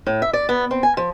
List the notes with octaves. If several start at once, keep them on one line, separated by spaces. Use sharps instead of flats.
A2
E5
D5
B3
C4
G#5
F3